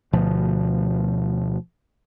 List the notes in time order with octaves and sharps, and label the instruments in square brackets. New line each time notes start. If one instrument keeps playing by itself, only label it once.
[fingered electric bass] D2 B2 F3